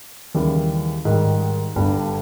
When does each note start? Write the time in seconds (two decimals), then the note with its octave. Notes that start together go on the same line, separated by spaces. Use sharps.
0.34 D#2 C#3 E3 G3 A#3
1.05 G#2 D#3 G3
1.75 G1 G2 G3